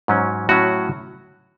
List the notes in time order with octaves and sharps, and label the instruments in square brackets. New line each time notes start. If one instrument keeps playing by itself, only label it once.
[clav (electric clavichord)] G#2 F#3 C#4
A2 F#3 C#4 F#4